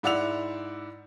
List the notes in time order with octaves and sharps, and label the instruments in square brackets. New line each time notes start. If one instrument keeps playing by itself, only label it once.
[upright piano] G#2 E4 D5 F#5 E6 F7